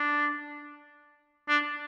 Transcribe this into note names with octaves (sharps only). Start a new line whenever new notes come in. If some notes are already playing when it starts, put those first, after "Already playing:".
Already playing: D4
D4